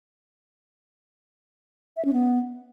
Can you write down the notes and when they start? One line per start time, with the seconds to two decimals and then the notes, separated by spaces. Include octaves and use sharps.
1.97 E5
2.05 C#4
2.13 B3